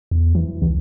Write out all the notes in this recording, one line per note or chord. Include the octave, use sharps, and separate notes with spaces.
E2
E3
C#2